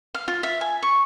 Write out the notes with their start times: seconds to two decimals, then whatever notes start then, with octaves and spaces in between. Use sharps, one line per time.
0.14 F5
0.28 F4
0.43 E5
0.61 G#5
0.82 C#6